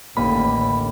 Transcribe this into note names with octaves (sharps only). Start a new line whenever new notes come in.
A1 D#2 D3 B5